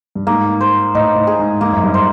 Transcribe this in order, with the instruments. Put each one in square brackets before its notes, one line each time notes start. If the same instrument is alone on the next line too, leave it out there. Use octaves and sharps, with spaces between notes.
[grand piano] G2
[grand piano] G#2 [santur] A#3
[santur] C5
[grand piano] A2 [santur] D#4
[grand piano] A2
[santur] G#4
[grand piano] G#2
[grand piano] G#2 [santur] A#3
[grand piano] F#2
G2
[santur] C5